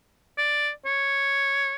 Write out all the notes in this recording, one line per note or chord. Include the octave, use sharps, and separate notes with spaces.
D5
C#5